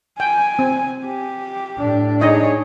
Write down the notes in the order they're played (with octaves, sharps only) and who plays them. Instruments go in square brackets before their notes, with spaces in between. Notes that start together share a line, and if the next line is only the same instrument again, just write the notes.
[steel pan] G5 [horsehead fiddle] G#5
[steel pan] C4
[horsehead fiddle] G4
[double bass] A2 D4
[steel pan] D#4 D#5 [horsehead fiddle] G#4 C#5